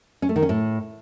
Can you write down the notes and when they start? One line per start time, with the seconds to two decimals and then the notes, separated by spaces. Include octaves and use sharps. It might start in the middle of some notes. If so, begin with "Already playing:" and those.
0.22 C#4
0.29 A3
0.36 D#3
0.42 C#4
0.49 A2